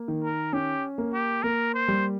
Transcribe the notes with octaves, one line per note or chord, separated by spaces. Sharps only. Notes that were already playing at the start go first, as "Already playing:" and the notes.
Already playing: A#3
D#3
A#4
C#4 G4
A#3
G4
A#3 A#4
C5
G3